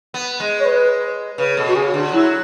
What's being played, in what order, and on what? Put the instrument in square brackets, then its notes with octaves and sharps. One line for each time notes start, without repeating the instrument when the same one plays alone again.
[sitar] B3
G#3
[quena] C#5
B4
[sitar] C#3 [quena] B4
[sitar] B2 [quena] A4
[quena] F#4
[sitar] C#3 [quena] G#4
[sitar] D3 [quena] G#4
[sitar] F#3 [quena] E4